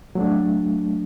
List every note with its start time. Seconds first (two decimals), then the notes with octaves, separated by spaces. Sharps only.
0.15 F#3 A3 D4